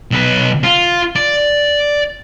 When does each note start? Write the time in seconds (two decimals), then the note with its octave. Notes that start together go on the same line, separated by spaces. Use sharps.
0.11 B1 B4
0.64 F4
1.16 D5